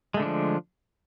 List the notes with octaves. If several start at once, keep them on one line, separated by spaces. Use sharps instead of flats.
D3 F3 G#3 A3 D4